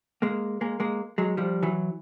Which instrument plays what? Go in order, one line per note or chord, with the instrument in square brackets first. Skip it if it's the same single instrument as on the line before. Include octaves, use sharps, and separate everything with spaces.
[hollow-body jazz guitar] G#3 A#3
G#3 A#3
G#3 A#3
F#3 G#3
F3 G3
E3 F#3